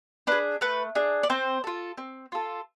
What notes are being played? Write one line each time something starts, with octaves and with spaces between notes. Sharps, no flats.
D4 G#4 B4
A3 B4
D4 G#4
D5
C4 C5
F4 A4
C4
F4 A4